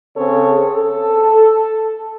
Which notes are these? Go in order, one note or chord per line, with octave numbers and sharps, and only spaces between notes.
C#3 C4 G#4 A4 C#5
A4